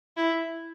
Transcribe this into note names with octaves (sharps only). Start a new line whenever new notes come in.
E4